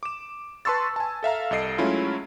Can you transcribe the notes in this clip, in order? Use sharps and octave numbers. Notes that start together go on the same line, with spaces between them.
D6 E7
B4 A5 C6 C#6 E6 A6
G#5 A5
A4 E5 F5 A#5
C2 A4 D#5 C7 D7
F#3 G#3 A3 C#4 E4 F4